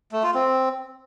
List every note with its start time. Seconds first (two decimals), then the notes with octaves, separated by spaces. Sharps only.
0.12 A3
0.23 F4
0.34 C4